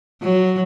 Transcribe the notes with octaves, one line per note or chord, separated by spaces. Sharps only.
F#3